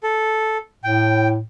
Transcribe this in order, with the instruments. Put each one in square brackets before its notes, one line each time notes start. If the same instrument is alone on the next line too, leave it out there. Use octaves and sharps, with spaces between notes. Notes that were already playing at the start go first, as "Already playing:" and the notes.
[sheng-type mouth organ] A4
[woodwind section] A2 [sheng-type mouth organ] G5